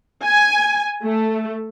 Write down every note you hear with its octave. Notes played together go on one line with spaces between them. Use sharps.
G#5
A3